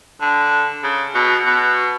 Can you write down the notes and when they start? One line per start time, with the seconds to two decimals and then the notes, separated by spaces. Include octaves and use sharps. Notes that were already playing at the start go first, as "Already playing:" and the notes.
0.21 D3
0.84 C#3
1.15 B2
1.46 B2